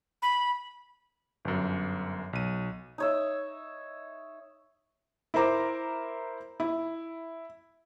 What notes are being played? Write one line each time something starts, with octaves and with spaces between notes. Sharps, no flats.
B5
G1 F#2
B1 D#7
D#4 C#5 E5
E4 A#4 C5 A#5 D6
E4